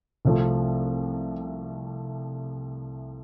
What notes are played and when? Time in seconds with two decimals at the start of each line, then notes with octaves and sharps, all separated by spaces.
0.25 C2 C3 F3 A3